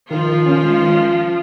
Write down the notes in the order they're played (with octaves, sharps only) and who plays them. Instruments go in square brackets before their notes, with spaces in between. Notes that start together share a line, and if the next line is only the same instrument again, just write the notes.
[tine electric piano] D#3 [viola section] F3 F4
[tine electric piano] D#3
C#4
G#3
D#3